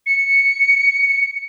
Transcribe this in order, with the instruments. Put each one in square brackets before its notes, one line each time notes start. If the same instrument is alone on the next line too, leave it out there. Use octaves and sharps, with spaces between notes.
[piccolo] C#7